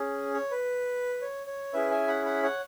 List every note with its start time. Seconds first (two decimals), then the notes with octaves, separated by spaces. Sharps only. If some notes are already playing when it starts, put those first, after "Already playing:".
Already playing: C#4 G#4
0.34 C#5
0.51 B4
1.21 C#5
1.47 C#5
1.73 C#4 E4 G#4 B4 E5
1.91 E5 G#5
2.07 F#5 B5
2.25 F#5 B5
2.43 C#5 F#5